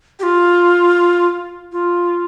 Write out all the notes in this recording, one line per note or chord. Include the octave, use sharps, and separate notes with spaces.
G4
F4
F4